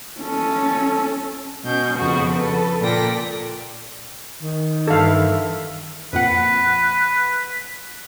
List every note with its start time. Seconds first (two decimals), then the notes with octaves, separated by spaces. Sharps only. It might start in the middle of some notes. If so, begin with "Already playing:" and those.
0.21 C#4 A4
1.62 B2 C#4 G6
1.95 F2 C#3 B3 F#4
2.35 A4 B4
2.80 A#2 A4 D5 G5 A#6
4.42 D#3
4.87 G2 E3 A4 F5
6.13 F2 A#2 B4 F#5